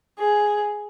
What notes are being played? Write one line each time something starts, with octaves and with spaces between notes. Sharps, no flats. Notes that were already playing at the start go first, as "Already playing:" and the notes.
G#4